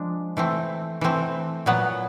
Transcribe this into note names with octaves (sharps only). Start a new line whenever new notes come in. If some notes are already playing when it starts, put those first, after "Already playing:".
Already playing: F3 G#3 D4
E3 A3 C4
E3 A3 C4
A#2 F#3 B3